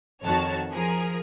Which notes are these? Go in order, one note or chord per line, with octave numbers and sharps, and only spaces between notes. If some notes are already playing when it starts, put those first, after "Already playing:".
F2 D#3 F#4 C#5 A5
F3 G#4 A#4